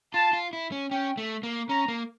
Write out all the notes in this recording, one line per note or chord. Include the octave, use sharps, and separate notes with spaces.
F4 A5
F4
E4
C#4
C#4 G5
A3
A#3
C#4 A#5
A#3